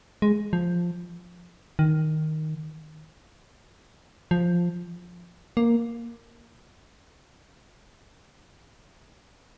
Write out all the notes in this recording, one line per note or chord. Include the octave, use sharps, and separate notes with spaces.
G#3
F3
D#3
F3
A#3